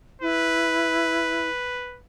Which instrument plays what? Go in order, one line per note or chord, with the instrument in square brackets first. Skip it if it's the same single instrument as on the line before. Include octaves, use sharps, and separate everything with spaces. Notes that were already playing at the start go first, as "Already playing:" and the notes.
[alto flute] E4 [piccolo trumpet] B4